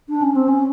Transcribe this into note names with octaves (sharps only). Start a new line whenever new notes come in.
D4
C#4
C4
C#4